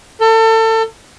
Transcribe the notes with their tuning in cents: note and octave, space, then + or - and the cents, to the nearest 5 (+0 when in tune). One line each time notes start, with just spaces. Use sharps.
A4 +30